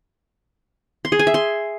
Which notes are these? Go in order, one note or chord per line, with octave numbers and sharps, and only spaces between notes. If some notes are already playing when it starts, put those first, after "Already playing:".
C6
G#4
G#5
E5
C6